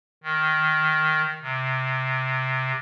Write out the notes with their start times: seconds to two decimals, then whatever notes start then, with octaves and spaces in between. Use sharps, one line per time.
0.24 D#3
1.42 C3